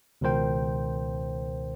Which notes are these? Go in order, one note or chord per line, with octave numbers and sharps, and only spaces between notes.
C#2 B2 D#3 A#4 C5 G5